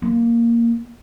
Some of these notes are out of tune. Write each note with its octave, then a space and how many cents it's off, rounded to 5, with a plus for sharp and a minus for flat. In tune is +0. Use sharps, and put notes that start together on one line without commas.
A#3 +0